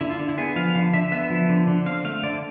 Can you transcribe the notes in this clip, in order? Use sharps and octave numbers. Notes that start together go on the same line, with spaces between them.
D3 E4
F4
D3
E4
B3 G#4
F3 F5
D3 F5
D3 E5
B3 E5
F3
D3
D3
C4 F5
A3 F5
D3 D5